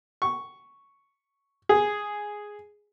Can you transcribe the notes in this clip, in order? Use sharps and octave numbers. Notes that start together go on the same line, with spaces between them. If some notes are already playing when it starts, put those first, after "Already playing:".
C#6
G#4